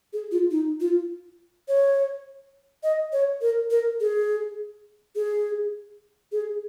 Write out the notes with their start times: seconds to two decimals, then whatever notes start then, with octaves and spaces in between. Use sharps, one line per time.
0.13 G#4
0.31 F4
0.51 D#4
0.80 F4
1.68 C#5
2.83 D#5
3.13 C#5
3.41 A#4
3.71 A#4
4.00 G#4
5.15 G#4
6.32 G#4